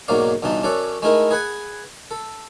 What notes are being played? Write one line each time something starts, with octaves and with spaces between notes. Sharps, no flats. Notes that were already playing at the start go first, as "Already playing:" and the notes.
B1 G#2 F#3 A#3 D5 F5
B1 G2 E3 D#4 A5
F#2 C#4 A4 D5 F#5
G#3 A3 D#4 E4 A#4
G#4 B4 F#5 G#5
A4